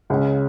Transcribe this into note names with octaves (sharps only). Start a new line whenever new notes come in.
C#2 C#3 G#3 C#4